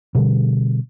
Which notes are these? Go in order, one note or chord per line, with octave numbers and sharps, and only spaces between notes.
B2 D3 G3